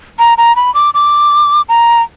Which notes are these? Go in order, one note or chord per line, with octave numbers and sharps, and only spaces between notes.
A#5
A#5
B5
D6
D6
A#5